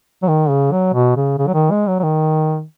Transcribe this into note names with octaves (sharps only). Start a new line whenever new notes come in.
F#3
D#3
C#3
F#3
B2
C#3
C#3
F#3
D#3
G#3
F#3
F#3
D#3